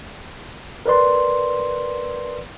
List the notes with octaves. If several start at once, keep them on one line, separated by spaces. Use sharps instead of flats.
A#4 B4 D5 C6